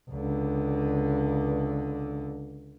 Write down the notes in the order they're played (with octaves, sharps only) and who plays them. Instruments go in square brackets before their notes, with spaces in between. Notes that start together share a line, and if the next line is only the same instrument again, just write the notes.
[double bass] C#2 D3